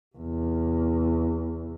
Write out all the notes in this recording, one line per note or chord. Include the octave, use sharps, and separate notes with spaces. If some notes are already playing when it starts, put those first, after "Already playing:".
E2 C3